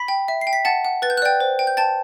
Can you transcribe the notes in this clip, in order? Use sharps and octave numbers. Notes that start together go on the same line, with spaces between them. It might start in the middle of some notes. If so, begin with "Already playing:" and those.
Already playing: B5 B6
G5
E5
C7
G5
B6
F#5 A5 A6
F#5
B4 A6
G6
F#6
D5 G5 G6
C5
G5
G6
G5 A5 A6